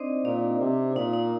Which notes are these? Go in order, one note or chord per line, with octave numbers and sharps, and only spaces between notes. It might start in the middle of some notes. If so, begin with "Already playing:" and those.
Already playing: C4 D4 D#4 C5 D5 D#5
A#2 D4 D5
C3
A#2 D#4
D#4